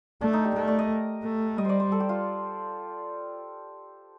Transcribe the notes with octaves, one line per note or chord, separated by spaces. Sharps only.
A3 D4
D#4
G4
A3 A#4
D5
D#5
A3
G3 D#5
C5 D5
C5
A4
G4
F4